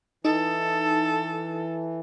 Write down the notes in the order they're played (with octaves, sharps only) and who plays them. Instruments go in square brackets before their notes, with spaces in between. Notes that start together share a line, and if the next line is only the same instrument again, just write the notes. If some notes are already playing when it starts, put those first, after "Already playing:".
[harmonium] E3 [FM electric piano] D#4 [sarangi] A4